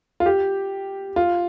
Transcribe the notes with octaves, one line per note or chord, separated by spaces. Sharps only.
F4
G4
F4